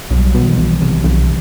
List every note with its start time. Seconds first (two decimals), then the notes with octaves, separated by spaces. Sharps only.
0.10 B1 F#3
0.18 G3
0.26 F#3
0.35 B2
0.41 D#3
0.46 E3
0.57 B1
0.81 B1 C3
1.04 B1 C3